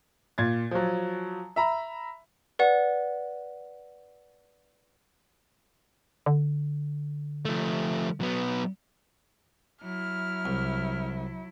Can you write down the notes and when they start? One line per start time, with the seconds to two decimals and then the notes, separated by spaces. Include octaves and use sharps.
0.38 A#2 G#6 A6
0.71 F3 F#3
1.56 E5 A#5 B5
2.59 B4 D5 F#5
6.26 D3
7.45 F3 A3
8.21 F#3 B3
9.83 F#3 E4 F6
10.45 C2